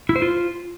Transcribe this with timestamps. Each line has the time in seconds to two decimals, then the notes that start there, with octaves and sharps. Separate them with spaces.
0.09 E4
0.16 C5
0.22 F4